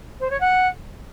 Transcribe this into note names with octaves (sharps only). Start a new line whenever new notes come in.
C5
C#5
F#5